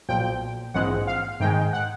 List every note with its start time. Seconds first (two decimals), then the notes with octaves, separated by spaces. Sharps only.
0.09 B1 A#2 F3 G5
0.74 A#1 G#2 E3 G#3 C4 F#5
1.07 F5
1.40 G#2 D#3 G#3 G5
1.73 F#5